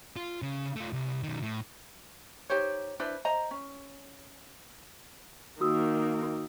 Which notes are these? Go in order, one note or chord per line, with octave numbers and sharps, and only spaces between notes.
F4
C#3
A3 F4
C2
B1 D#3
A2
D#4 G4 C5 C#5
D4 E4 B4 C5
C5 D#5 A#5
C#4
D#3 A#3 F#4 D#6 E6